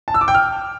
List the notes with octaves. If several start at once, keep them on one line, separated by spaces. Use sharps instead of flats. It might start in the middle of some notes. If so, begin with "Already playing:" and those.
A5
E6
D6
G5
F6